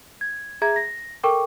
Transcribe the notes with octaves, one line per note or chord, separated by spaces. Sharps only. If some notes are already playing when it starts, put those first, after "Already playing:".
G#6
G#4 E5 A#5 G#6
A#6
A4 A#4 G5 C#6 D6